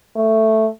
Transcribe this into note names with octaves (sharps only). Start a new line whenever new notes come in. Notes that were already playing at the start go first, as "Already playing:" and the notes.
A3